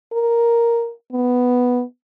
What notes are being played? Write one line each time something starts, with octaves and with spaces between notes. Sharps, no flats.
A#4
B3